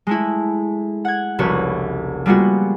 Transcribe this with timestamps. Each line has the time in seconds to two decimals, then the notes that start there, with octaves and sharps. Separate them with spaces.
0.07 G#3 A3 E4
1.05 F#5 G#6
1.39 F1 C2 C#3 F#4 B4 C#5
2.26 G3 G#3 A#3 B3 F4 F#4